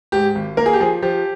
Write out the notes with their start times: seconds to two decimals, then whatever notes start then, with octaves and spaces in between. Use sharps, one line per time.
0.12 G#2 G4
0.35 G#1
0.57 A#3 A#4
0.66 G#4
0.73 G4
0.80 F3 G#4
1.02 F3 G4